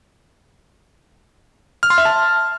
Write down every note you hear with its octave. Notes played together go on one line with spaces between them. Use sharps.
F6
C6
E5
A5